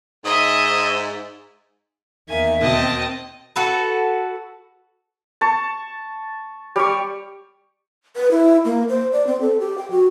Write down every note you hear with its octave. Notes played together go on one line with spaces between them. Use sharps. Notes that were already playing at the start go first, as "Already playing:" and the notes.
G#2 D#5 E5 D#6
E2 D#3 A#3 E5 G#5
D#2 B2 C4 D#5 G5 A5
F#4 A4 B4
A5 C#6
G3 G4 C#6
B4
E4
A#3
C5
D5
C4
A4
G4
G5
F#4